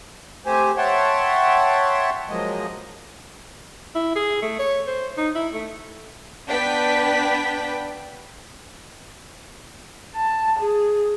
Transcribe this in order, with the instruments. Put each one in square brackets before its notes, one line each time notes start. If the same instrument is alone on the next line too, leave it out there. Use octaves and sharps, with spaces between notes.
[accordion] A3 C4 G4 C5 G#5
C#5 E5 F#5 G5 A5 C6
F3 F#3 G#3 A#3 D#5
[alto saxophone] E4
G#4
A3
C#5
C5
D#4
E4
A3
[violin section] B3 D4 B4 G5 B6
[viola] A5
G#4